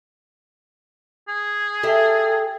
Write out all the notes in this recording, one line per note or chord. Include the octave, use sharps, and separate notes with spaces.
G#4
G4 A4 E5